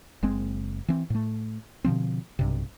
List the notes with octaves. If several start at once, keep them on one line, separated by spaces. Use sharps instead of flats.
F#1 G#3 C4
E3 C4
A2 A3
B2 D3 F3 C4
B1 G2 C3